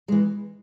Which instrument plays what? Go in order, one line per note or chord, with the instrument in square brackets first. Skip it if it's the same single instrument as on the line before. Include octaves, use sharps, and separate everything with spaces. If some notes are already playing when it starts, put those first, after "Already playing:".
[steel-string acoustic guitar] E3 G#3